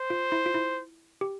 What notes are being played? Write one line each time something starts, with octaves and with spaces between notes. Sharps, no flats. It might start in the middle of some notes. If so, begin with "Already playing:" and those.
Already playing: C5
F4
E4
F4
E4
G4